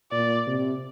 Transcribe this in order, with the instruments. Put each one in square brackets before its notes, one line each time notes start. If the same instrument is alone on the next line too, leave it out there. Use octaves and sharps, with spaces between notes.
[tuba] A#2 [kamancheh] D5
[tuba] C3